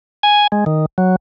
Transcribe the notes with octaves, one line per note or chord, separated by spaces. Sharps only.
G#5
G#3
D#3
F#3